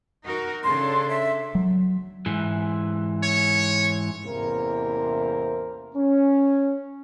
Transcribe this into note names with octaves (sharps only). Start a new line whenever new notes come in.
D#4 F#4 A#4
C#3 D4 A4 C6
E5
F#3
G#2 E3
C#5
A1 E2 C3 A#3 A#4 C5
C#4